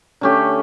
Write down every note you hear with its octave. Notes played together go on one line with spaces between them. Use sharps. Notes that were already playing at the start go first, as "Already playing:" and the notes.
D3 A3 C#4 G4